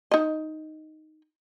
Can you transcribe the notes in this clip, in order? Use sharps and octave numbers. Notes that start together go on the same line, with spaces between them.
D#4 D#5